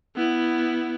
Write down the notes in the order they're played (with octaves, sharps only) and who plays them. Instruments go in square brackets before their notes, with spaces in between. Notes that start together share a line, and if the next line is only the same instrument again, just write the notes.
[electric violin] B3 E4